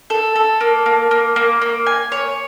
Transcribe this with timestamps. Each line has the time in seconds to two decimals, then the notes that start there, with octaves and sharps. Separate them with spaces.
0.10 A4
0.36 A4
0.61 A#3
0.86 A#3
1.11 A#3
1.36 A#3
1.62 A#3
1.86 G#5
2.12 C#5